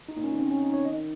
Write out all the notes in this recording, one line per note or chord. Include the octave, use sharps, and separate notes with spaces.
D#4
A#2
C#4
D#3
C#3 C4
C#4
D#4
C#5
D#3 D#5